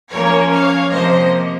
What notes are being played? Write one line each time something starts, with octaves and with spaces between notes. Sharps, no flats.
F3 A#3 C#4 A#4 C#5
C#5 F5
C3 F3 A#3 C5 D#5